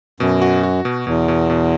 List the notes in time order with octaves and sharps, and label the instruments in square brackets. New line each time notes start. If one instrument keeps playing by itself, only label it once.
[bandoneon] F#2 [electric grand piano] B2
[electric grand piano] F#4
F#4
B2
[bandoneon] E2 [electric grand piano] B2
[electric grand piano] B2
B2